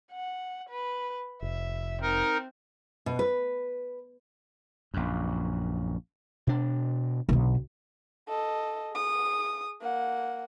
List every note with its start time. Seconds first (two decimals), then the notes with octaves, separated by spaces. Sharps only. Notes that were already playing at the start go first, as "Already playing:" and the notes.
0.12 F#5
0.70 B4
1.42 F1 E5
2.02 C4 D#4 A#4
3.06 B2
3.19 B4
4.94 A#1 F#2
6.47 B2 D4
7.29 B1 D3
8.28 A4 D#5
8.93 G#4 D#6
9.82 A#3 F#5